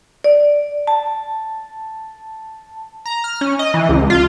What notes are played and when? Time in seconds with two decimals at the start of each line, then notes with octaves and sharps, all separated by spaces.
0.24 D5
0.87 A5
3.06 A#5
3.24 F6
3.41 C#4
3.59 D#5
3.74 E3
3.89 C#2
4.10 F4